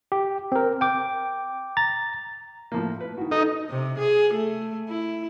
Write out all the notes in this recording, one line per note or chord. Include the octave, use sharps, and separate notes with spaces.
G4
C4 A#4
G5 D6
A#5 A6
A2 F3 A#3
B4
D#3 F#4
D#4 A4
C3
G#4
A3
E4